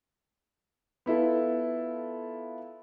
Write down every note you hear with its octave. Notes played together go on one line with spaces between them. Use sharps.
B3 E4 F4 A4